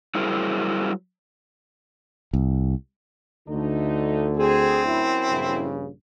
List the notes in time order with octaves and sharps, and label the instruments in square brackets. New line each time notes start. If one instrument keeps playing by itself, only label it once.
[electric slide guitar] F#3 G3 E4 G#4 A#4 C5
[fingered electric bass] C2
[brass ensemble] D2 D3 [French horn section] A3 D#4
[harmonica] C4 [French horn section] G#4
[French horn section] F#2 E4
[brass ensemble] A#1 G2 C#3